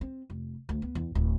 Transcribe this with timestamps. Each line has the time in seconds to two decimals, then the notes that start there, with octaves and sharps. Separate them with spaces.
0.01 C4
0.30 F1
0.69 D2
0.82 B3
0.95 E2
1.15 D1